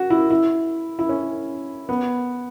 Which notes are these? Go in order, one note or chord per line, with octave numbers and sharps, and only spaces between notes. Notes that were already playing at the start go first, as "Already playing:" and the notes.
Already playing: F#4
E4
E4
E4
C#4
B3